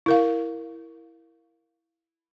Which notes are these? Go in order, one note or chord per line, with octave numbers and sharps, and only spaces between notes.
E4 A#4 F5